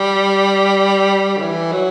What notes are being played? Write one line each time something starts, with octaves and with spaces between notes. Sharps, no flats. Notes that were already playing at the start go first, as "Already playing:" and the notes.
Already playing: G3
D3
E3
F#3